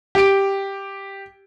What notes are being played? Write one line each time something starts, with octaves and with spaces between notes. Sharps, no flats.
G4 D7